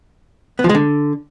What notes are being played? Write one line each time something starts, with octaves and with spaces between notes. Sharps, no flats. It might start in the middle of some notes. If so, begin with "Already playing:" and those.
B3
F3
G#3
D3